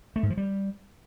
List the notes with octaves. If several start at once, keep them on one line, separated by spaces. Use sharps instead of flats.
A3
G#2
F3
G3